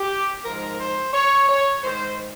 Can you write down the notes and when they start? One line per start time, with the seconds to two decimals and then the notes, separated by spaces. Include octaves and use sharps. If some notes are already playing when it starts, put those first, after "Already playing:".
Already playing: G4
0.44 G#2 F3 A#4
0.79 C5
1.13 C#5
1.49 C#5
1.83 G#2 D#3 C5